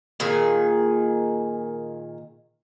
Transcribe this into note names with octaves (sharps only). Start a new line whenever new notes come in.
A#2 D#3 G#4